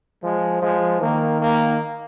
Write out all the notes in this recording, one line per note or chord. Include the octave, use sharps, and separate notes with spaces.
F3 G#3
F3 G#3
D#3 A#3
A#3